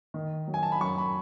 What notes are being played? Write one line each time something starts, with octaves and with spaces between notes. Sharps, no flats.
D#3
F#3
G#5
A5
B5
F#2 C#6
B5